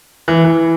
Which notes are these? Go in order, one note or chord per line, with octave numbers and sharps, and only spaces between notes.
E3
E3